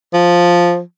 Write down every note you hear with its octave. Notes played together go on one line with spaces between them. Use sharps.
F3